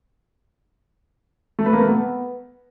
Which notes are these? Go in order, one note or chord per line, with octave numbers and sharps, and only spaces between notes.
A3
B4
A#3
A3
B3